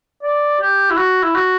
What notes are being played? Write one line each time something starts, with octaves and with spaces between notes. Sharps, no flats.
D5
G4
E4
F#4
E4
F#4